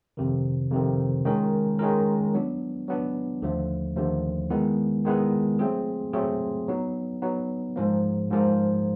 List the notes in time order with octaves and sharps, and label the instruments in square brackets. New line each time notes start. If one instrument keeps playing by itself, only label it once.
[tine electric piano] F2 C3 D#3
F2 C3 D#3
D#3 G#3 C#4 F4 A#4
D#3 G#3 C#4 F4 A#4
F#3 B3 D4
F#3 B3 D4
D#2 D3 F3 A3
D#2 D3 F3 A3
D#3 G#3 B3 E4
D#3 G#3 B3 E4
F#3 A3 C4 F4 G#4
F#3 A3 C4 F4 G#4
F#3 B3 D#4
F#3 B3 D#4
G#2 F3 A#3
G#2 F3 A#3